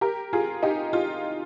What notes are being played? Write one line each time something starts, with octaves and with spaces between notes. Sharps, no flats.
G4 A#4
F4 G#4
D#4 G4
F4